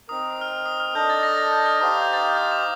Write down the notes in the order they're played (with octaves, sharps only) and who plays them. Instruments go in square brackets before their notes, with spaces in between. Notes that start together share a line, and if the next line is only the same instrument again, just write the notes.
[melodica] C4 D#4 A#4 [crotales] D#6
[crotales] D#6
F6
D#6
F6
[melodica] D4 A4 D#5 [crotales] G6
[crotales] A6
A#6
A6
G6
F6
[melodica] D#4 G4 C5 F5 [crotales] D#6
[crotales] D#6
G6
A6
G6
D#6
D6